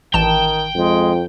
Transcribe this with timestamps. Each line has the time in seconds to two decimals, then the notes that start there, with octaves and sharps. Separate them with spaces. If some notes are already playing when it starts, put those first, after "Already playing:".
0.14 A1 D#3 G5 A5 E7
0.75 F2 G#3